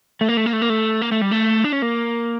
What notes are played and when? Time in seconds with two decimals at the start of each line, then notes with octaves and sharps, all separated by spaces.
0.21 A3
0.29 A#3
0.37 A3
0.46 A#3
0.53 A3
0.62 A#3
0.70 A3
1.02 A#3
1.12 A3
1.22 G3
1.32 A3
1.64 D4
1.72 C#4
1.82 A#3